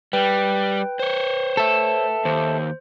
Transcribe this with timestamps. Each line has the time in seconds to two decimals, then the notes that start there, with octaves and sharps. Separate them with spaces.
0.13 G3 B4 G5
0.99 C5 C#5
1.57 A4 E5
2.25 D#2 C5